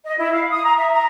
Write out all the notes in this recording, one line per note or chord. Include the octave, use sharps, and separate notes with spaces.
D#5
E4
F5
D#6
A#5
E5
A#5